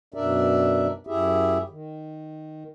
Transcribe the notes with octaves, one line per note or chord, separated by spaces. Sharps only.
F#2 B2 D4 A#4 D5 E5
F#2 E4 G4 G#4 E5
D#3